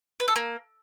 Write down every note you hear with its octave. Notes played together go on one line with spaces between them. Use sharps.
B4
A4
A#3